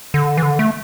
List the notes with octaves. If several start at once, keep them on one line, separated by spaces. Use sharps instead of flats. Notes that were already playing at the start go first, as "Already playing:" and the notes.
D3
E3
D3
A3